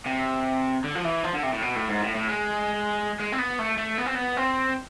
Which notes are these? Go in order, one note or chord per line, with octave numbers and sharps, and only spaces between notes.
C3
D3
F3
E3
F3
D3
C3
A2
B2
A2
G#2
A2
A2
G#3
G#3
C4
B3
A3
A3
B3
C4
B3
C4